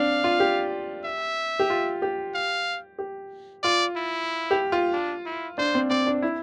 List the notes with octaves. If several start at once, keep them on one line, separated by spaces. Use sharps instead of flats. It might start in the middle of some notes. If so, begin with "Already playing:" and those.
Already playing: C4 D4 F5
F4
G4
E5
G4
F4
G4
F5
G4
F4 D5
E4
G4
F4
D4
E4
D4 C5
C4
C4 D5
D4
E4